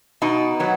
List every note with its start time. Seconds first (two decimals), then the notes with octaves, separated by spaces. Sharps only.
0.22 B2 D#4
0.60 F#3 B3